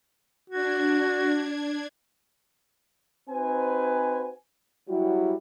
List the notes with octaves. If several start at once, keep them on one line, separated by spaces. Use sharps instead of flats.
D4 F#4 G#6
C4 D#4 F#4 B4 C5 G#5
F#3 G3 E4 F#4